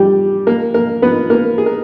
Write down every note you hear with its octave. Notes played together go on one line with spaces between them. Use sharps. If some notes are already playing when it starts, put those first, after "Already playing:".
Already playing: G3 G4
A#3 A#4
A#3 A#4
B3 B4
A#3 A#4
G#4
A#4